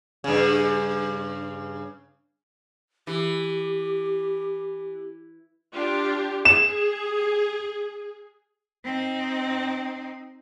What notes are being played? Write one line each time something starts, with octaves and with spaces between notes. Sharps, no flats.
G2 C#3
E3 G4
D4 F4 G4
G#4 E7
C4 D#4